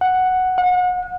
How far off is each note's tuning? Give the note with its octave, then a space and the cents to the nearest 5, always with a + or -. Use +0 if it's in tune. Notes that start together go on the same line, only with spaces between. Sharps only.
F#5 +0
F#5 -35